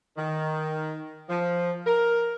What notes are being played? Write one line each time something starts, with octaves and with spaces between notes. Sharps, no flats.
D#3
F3
A#4